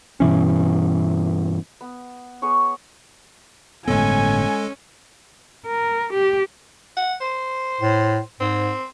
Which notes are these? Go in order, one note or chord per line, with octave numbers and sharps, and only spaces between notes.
G2 B2 E3 C#4
B3
B3 G#4 C#5 C#6
G1 A2 G#3 B3 C#4 A4 G#5
A#4
G4
F#5
C5
A2
G#2 C4